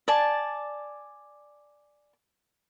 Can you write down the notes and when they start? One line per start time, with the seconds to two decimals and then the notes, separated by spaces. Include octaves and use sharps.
0.08 D5 G#5 A5